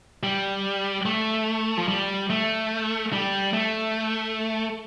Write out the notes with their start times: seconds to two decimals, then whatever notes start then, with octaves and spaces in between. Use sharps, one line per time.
0.23 G3
1.06 A3
1.77 F3
1.88 G3
2.30 A3
3.13 G3
3.53 A3